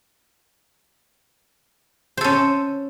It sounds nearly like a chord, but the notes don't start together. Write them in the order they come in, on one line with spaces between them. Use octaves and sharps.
C5 A4 C#4